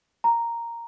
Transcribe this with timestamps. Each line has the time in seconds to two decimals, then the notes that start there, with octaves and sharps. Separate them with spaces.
0.24 A#5